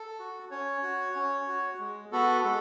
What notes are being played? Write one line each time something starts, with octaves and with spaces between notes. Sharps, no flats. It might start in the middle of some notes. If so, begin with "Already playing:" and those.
Already playing: A4
F#4
C#4 C#5
F#4
C#4
F#4
G#3
B3 F#4 A4
G#3 A4